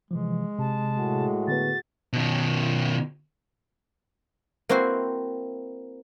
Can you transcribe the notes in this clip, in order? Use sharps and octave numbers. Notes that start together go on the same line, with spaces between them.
C3 E3 F3 G#3
C3 A5
A2 F#4 G#4
D3 B3 B4 A6
B2 D#3
A#3 C4 E4 F#4 C5